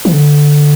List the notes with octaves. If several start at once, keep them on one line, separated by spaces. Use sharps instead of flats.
E3
D3